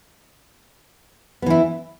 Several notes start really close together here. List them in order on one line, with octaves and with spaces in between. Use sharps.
B3 E3 E4